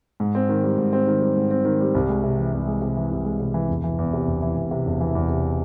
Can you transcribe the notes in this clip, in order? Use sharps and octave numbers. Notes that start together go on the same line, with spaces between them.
G#2
C4
D#3
G3
G#2
C4
D#3
G3
G#2
C4
D#3
G3
C2
G#3
C3
E3
C2
G#3
C3
E3
C2
G#3
C3
E3
E1
E3
E2
C3
E1
E3
E2
C3
E1
E3
E2
C3